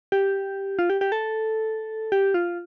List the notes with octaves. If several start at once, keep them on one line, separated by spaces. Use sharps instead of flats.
G4
F4
G4
G4
A4
G4
F4